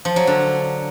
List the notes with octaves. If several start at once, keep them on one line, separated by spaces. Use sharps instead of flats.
F3
F#3
D3